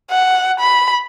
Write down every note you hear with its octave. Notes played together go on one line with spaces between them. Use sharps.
F#5
B5